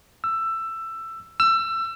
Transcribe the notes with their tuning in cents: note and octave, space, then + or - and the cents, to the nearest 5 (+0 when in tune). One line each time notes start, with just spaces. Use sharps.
E6 +15
E6 +25